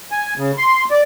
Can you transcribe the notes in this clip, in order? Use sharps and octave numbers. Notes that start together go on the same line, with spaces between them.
G#5
C#3
C6
D5